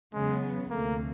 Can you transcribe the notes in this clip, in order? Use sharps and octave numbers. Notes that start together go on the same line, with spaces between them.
E2 C#3 F#3 G#3 B3
D2 C3 F3 A3 A#3